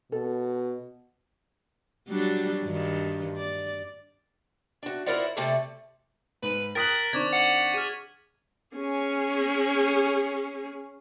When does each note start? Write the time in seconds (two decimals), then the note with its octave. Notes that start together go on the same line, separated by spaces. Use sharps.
0.12 B2 A4
2.09 F#3 G3 D4
2.65 G2 D#3
3.37 D5
4.83 D4 F#4
5.06 E4 F4 A#4 C5 D5 F#5
5.36 C3 A3 E4 A4 D5 A5
6.43 G#2 B4
6.75 A#4 G5 D#6 F#6 A6 B6 F#7
7.13 D#3 C4 D4 C#6 D6 G#6
7.33 F#5
7.74 G#4 F6 D#7
8.76 C#4 G#4